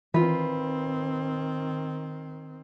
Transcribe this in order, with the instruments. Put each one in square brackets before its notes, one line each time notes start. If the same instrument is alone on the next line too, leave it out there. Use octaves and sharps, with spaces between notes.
[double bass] D#3 C4 [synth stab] E3 [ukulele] F4 B4